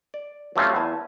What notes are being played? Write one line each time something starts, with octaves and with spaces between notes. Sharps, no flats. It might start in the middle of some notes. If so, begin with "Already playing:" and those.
D5
F#3 G3 A3 C4 C#4 F4
E2 G#5 A5